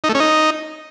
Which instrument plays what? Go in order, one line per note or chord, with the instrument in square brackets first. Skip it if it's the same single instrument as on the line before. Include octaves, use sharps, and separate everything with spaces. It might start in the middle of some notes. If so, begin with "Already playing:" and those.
[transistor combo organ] D#4
A3
C#4
D#4